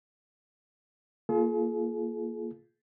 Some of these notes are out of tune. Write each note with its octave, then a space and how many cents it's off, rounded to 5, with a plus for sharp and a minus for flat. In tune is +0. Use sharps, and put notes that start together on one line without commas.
A#3 +0 F4 -10 G#4 +45